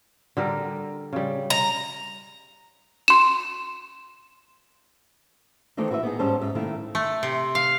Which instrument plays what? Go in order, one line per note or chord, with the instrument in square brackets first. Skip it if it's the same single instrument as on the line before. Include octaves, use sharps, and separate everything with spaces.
[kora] D3 G3 A#4
C#3 G3
[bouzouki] A#5
[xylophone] C6 E7
[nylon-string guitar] D#3 E3 A3 C4 D4 D#4
E4 F#4 B4 D#5 E5
B3 D#4 G#4
G#2 G3 C#4 C5 A5
G#2 E5
D#3 A3 A#3 E4
[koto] A3
C3
F5